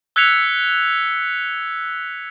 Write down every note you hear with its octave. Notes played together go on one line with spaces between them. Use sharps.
E6 F#6 G#6 B6 C#7 F7